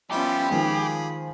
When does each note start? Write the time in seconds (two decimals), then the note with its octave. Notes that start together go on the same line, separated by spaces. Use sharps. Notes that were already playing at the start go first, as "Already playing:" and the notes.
0.11 F3 G3 B3 C#4 E4 F4 G4
0.51 D#3 F3 G#3 G#4 B5